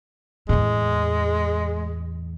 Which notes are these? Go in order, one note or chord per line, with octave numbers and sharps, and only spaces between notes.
E2 A2 G#3